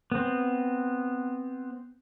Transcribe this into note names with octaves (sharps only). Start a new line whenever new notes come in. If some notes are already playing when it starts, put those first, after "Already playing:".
B3 C4